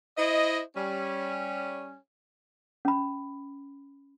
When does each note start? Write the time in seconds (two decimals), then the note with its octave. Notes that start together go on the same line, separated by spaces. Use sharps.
0.18 E4 C5 D#5
0.76 G3 C#4
2.85 C#4 B5